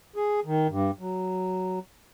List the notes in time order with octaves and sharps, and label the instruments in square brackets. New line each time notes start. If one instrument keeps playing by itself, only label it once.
[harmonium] G#4
D#3
G2
F#3